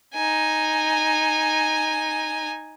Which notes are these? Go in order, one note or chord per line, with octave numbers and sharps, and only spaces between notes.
D#4 G#5